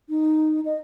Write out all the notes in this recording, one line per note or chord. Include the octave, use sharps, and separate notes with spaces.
D#4
D#5